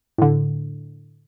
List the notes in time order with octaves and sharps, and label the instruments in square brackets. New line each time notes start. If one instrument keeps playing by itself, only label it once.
[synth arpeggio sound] A2 D3